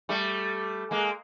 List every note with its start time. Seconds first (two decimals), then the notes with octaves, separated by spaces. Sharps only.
0.09 G3 A3
0.91 G#3 A#3